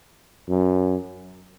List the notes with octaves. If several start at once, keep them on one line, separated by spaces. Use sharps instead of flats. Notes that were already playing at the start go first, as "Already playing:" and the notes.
F#2